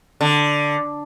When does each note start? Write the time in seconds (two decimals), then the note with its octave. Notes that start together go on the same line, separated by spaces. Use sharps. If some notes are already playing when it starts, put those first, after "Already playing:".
0.21 D3